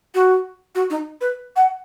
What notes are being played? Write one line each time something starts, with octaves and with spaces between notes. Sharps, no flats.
F#4
F#4
D#4
B4
F#5